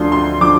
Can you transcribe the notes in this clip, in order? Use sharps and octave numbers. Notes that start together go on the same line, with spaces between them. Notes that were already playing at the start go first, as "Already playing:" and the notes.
Already playing: D2 D3 F3 C6
C6
D3 F3 D6